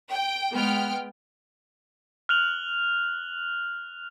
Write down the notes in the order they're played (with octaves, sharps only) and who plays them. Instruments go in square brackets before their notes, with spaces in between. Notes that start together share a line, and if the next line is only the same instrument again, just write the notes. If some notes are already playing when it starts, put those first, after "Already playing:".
[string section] G5
G#3 B3 G5 F6
[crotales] F6 F#6 F7 F#7